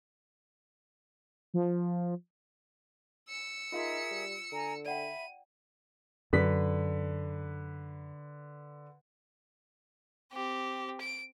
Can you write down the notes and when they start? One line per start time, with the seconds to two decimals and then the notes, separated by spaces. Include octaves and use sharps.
1.54 F3
3.29 E6 C#7
3.72 D#4 F4 G#4 A#4 E5 F5 C6
4.11 G3
4.52 D3 G#5 A#5
4.86 D5 E5 F#5 G5 B5 D#7
6.33 F#2 D3 B4 B6
10.33 C4 G4
11.01 D7